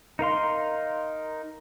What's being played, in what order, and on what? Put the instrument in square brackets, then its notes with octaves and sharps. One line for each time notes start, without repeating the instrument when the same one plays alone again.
[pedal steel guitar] D#4 A#4 F5 C6